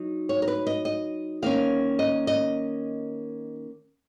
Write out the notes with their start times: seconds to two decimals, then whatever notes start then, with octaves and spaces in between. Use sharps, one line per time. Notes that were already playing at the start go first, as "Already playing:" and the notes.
Already playing: F#3 D#4
0.29 C#5
0.42 A#4
0.48 B4
0.67 D#5
0.85 D#5
1.42 D#3 A#3 C#4 F5
1.99 D#5
2.27 D#5